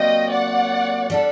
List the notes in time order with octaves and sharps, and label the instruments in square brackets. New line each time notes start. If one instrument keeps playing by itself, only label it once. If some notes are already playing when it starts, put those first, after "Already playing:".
Already playing: [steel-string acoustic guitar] C3 F#3 A#3 D4 G4 [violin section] D#5 G5
[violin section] D5 F#5
[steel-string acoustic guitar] G3 D4 A4